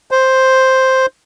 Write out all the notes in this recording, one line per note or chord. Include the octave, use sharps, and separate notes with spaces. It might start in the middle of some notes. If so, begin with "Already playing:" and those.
C5